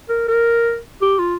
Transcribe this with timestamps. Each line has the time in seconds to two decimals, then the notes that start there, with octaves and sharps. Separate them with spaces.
0.09 A#4
0.28 A#4
1.02 G4
1.19 F4